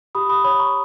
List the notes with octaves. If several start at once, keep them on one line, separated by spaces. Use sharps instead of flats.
G4 B5 D#6
B5 D#6
C#5 B5 D#6
A#5 C#6